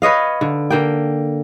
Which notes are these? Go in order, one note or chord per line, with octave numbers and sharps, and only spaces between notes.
B4 C#5 D#5 F5
D3
D3 A#3 G5